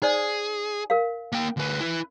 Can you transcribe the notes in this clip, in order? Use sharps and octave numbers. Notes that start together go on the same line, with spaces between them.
D#4 G#4 C5 D5
A#4 F5
A#3 G5
D2 B4
E4 B4